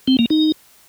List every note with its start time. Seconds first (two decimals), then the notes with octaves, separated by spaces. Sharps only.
0.08 C4
0.19 A#3
0.30 D#4